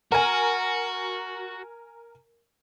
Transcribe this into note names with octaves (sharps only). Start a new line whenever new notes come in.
F#4 A#4 G#5